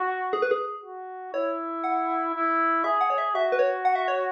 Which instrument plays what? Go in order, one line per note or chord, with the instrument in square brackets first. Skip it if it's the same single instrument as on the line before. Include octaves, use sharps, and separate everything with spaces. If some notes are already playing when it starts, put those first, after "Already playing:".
Already playing: [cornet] F#4
[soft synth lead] G#4
B4
G#4
[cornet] F#4
[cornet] E4 [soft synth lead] C#5
[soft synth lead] F#5
[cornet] E4
[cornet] G#4 [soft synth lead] E5
[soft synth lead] F#5
C#5
E5
[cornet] F#4 [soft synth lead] E5
[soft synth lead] B4
C#5
F#5
E5
C#5